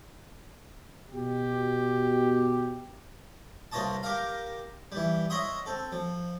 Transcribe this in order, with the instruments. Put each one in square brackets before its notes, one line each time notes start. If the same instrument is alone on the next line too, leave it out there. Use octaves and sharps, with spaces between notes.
[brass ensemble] B2 G4
[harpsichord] C2 F4 B4 C#5 D#5 A5
G4 A#4 F5
E3 G3
C#5 D#5 E5 F#5 C6 D#6
C4 A4
F3